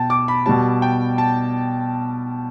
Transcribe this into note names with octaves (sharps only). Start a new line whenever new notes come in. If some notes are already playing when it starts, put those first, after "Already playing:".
Already playing: B2 G5 A5
D6
B5
B2 G3 A5
G5
A5